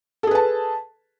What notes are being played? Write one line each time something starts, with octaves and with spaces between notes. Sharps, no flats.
G#4 A4 B4 A5